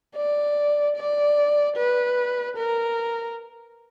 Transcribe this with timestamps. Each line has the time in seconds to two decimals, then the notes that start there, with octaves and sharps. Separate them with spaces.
0.16 D5
0.96 D5
1.76 B4
2.57 A#4